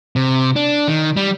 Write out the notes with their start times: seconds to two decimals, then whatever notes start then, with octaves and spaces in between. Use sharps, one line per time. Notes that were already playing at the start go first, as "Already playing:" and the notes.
0.16 C3
0.56 D4
0.88 D#3
1.17 G3